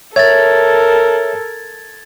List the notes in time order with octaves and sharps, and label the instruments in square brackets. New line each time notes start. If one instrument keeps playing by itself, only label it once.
[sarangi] A4 [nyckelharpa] A#4 [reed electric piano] C#5 E5 [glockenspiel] G#6 A6